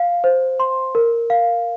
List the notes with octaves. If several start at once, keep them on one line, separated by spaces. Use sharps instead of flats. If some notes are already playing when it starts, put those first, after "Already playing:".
Already playing: F5
C5
C6
A#4
F5